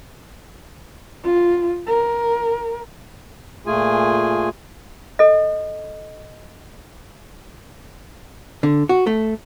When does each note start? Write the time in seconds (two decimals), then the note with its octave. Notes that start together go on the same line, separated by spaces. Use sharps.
1.24 F4
1.87 A#4
3.66 A#2 A3 F4 G#4 G#5
5.19 A4 D#5
8.63 D3
8.89 F#4
9.07 A3